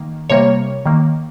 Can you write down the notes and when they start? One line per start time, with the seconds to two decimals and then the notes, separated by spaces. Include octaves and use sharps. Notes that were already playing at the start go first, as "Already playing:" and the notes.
Already playing: D#3 A#3
0.30 C3 G3 A#3 C#5
0.86 D#3 A#3